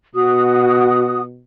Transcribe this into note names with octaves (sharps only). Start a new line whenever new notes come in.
B2 F#4 D#6